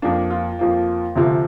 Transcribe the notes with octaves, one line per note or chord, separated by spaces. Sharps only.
F2 F3 A#3 D4
F4
F2 F3 A#3
D2 C3 F3